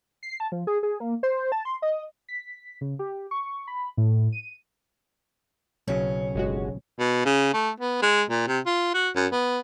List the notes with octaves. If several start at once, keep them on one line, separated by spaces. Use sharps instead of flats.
C7
A5
F3
G#4
G#4
A#3
C5
A5
C6
D#5
B6
C#3
G4
C#6
B5
A2
D#7
B1 C#3 F#3 C#4
G1 G#3 F#4
B2
C#3
A3
B3
G#3
A#2
C3
F4
F#4
F#2
B3